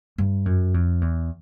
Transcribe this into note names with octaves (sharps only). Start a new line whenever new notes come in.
G2
F#2
F2
E2